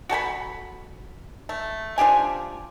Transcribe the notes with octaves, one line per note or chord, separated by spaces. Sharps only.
F#4 A4 G#5 B5
A3
F3 D4 G4 G#5